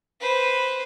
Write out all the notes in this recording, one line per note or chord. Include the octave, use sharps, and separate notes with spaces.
B4 C5